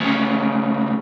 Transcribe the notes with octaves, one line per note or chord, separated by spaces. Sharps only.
D2 C#3